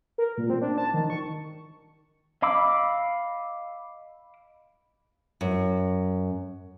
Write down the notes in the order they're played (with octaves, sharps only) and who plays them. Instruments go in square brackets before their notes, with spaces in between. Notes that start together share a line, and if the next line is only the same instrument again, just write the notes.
[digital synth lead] A#4
A#2
C4
D4
A5
D#3
C#6
[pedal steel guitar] D#5 F5 B5 D6 E6
[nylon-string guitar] F#2